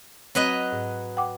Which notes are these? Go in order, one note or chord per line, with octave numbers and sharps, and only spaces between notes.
F#3 C4 B4 D#5
G#2
F#5 G5 D6